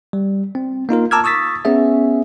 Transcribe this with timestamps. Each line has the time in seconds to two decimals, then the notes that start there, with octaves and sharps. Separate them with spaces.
0.13 G3
0.55 C4
0.89 A#3 D#4 F4 A#4
1.11 A5 A#5 D6 E6 F6 G#6
1.24 C#6 D#6 E6 A6 B6
1.65 B3 C#4 G#4 E5